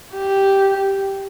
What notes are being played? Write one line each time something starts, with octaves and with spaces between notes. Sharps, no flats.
G4